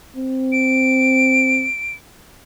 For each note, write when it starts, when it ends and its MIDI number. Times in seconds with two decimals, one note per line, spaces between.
0.16 1.68 60
0.52 1.94 98